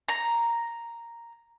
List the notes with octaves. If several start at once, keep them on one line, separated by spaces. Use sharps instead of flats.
A#5